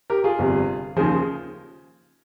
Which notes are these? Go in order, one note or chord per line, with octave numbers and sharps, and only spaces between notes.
G4 A#4
F4 G#4
G1 F2 C3 G3
D#2 C#3 F3 G#4 C5